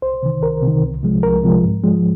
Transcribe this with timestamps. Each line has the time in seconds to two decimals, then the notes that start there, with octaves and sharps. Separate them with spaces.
0.02 C2 C5
0.23 C3 D#3
0.43 C2 A#4
0.63 C3 D#3
0.83 C2
1.03 C3 F3 G#3
1.23 C2 A#4
1.43 C3 F3 G#3
1.64 G#2
1.84 F3 G#3